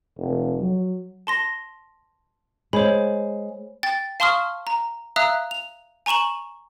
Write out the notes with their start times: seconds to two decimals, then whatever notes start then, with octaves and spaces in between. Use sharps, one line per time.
0.18 F1
0.59 F#3
1.27 A5 C6 A#6
2.73 G#3 C5 C#5 B5
3.83 G5 A6
4.20 F5 A5 C6 C#6 D#6 F6
4.67 A#5
5.16 E5 F5 A#5 D#6 E6 F#6
5.51 F7
6.06 G#5 A#5 C#6 E7 F#7